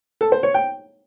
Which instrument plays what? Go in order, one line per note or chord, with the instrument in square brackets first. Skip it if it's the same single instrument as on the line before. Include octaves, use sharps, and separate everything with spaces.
[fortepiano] A4
C5
C#5
G5